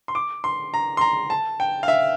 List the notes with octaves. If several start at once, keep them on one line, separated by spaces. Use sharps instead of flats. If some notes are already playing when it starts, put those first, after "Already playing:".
C6
D6
C6
A#5
C6
A#5
A5
G5
F5
E5